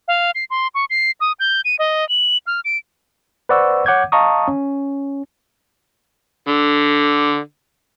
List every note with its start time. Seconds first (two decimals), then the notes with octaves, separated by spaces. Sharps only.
0.08 F5
0.35 C7
0.50 C6
0.75 C#6
0.90 C7
1.21 D#6
1.40 G6
1.65 D#7
1.79 D#5
2.09 F#7
2.47 F6
2.65 D7
3.49 B4 C5 D5 F#5 C#6 E6
3.86 C#5 F#5 D6 G6 G#6
4.12 D#5 F5 A5 A#5 C#6 D#6
4.48 C#4
6.48 D3